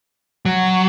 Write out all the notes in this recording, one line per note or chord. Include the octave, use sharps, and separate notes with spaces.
F#3